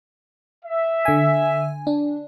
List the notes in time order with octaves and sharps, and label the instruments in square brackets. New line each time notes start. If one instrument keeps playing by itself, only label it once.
[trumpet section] E5
[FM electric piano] D3 G#5
D4